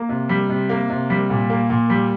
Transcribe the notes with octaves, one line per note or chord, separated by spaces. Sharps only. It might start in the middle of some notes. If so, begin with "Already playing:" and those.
Already playing: A#3
C3
G3
C3
A#3
C3
G3
A#2
A#3
A#2
G3